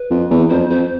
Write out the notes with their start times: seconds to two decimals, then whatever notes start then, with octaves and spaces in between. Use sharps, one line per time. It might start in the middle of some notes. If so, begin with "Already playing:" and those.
Already playing: B4
0.11 F2
0.31 E2
0.50 F2 C5
0.70 F2 C5